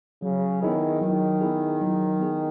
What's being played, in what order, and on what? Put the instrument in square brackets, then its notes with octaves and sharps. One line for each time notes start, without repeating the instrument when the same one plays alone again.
[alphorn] C#3 [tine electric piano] F#3
[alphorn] D#3 [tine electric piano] B3 E4 G#4
[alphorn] D#3 [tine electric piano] F#3
[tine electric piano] B3 E4 G#4
F#3
B3 E4 G#4